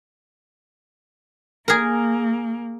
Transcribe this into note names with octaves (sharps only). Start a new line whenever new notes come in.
A#3 G#4 A#4